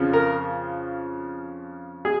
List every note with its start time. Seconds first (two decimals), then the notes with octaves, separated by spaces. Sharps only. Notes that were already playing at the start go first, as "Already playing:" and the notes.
Already playing: F2 C#3 F3
0.13 A#4
2.05 G#4